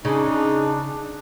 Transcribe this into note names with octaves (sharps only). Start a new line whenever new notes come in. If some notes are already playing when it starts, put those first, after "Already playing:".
C#3 D4 D#4